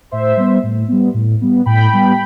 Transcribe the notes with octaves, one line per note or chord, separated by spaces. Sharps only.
A2 C5 E5
G3 B3
A2
G3 B3
A2
G3 B3
A2 G5 B5
G3 B3